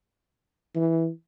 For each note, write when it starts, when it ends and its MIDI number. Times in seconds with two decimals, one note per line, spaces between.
0.76 1.09 52